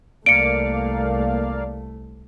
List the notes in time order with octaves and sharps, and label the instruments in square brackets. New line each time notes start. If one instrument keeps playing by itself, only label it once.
[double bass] C2 A3 [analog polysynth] A#3 D5 F5 [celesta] C#7 D7